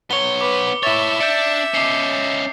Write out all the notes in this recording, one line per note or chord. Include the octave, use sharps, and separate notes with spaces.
B3 C#5 C#7 G7
B4 D6
E4 C#5 E5 A6
D4 G6 C#7
C#4 D#4 D6 C7